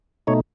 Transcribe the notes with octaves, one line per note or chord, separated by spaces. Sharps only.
B2 A3 D#4 C#5